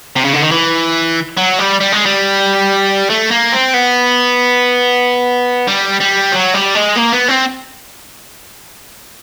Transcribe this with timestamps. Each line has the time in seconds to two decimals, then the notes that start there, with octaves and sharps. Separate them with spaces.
0.16 C3
0.25 C#3
0.33 D3
0.42 D#3
0.51 E3
1.37 F#3
1.58 G3
1.80 G3
1.92 G#3
2.06 G3
3.10 A3
3.31 A#3
3.52 C4
3.74 B3
5.67 G3
6.00 G3
6.32 F#3
6.54 G3
6.75 G#3
6.96 A#3
7.13 B3
7.29 C4